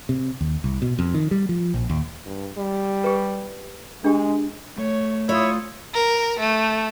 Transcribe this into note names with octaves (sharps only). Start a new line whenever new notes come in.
C3
D#2
C2
B2
F2
D#3
G3
F3
A#1
D#2
G2
G3
G4 B4
G#3 D4 G4
A3 C#5
E4 F4 C#5 D#6
A#4
A3